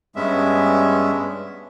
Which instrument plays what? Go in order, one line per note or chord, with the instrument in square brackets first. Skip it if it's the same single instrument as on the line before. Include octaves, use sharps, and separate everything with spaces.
[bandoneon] G2 G#3 B3 C#4 E5